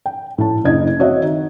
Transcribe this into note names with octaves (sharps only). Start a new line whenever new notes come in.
G5
A2 A5
F#1 D4 E4 D#5 G#6
C4 F#4 C#5 D#5 E5
D#3